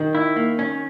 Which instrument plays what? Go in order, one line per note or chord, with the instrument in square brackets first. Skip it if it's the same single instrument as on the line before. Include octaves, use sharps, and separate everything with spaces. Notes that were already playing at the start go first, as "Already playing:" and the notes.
Already playing: [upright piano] D#3
[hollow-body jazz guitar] E4
A#3
C#4